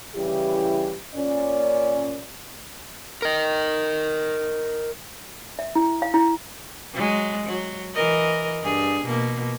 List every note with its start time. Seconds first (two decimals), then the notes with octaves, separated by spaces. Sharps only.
0.15 C#3 E3 G3 E4 G4
1.14 A#2 C#4 D5
3.22 A#4 D#5
5.59 E5
5.75 E4
6.02 F5
6.14 E4
6.94 F#3 G#3
7.46 F#3
7.94 E3 A#4 D#5
8.63 G2 G#4
9.04 B2 A#3